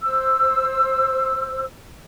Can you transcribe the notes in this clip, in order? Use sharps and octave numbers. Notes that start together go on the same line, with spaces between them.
C5 E6